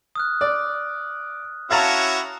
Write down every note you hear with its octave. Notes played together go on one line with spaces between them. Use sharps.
D#6 F6 F#6
D5
C#4 E4 F#4 F5 A5 A#5